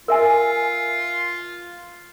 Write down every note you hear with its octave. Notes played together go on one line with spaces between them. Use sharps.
F4 A#4 E5 G#5